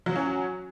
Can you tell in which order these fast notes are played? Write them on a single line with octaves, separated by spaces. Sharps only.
F#3 F#4 C#4